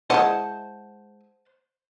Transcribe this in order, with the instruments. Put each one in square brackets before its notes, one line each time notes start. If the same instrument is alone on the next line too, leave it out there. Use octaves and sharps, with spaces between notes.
[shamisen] G#3 E4 D#5 [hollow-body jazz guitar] C5 F#5 A5